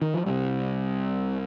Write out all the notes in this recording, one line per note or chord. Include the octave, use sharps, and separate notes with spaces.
D#3
F3
C2 C3 G3